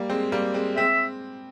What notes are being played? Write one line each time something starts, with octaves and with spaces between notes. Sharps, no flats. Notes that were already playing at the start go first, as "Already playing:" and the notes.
Already playing: G3 A#3
G#3 C4
G3 A#3
G#3 C4
G#3 C4 E5